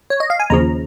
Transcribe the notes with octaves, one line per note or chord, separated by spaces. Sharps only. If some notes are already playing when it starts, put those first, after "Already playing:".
C#5
D#5
F5
G#5
D#2 C#3 F3 A#5